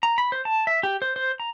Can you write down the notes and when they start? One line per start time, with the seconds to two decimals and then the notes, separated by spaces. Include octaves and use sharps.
0.03 A#5
0.18 B5
0.32 C5
0.45 A5
0.67 E5
0.83 G4
1.02 C5
1.16 C5
1.40 A#5